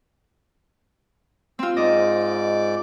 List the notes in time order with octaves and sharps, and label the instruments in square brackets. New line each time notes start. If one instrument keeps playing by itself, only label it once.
[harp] C4 F4 [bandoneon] E6
[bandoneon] G#2 D5 D6 [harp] D#5